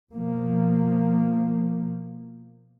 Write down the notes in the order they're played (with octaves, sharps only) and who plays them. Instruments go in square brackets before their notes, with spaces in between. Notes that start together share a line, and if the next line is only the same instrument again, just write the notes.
[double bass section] B2 F3 A#3